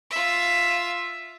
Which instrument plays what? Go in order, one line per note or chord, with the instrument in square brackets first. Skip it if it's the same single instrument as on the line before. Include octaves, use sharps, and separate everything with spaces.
[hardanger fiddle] F4 E5